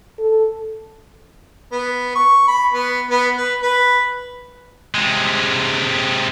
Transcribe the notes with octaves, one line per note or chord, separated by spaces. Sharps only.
A4
B3
C#6
B5
B3
B3
B4
B4
C3 G#3